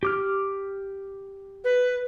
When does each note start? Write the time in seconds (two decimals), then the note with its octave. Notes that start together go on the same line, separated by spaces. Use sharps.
0.03 G4 D6 F6
1.64 B4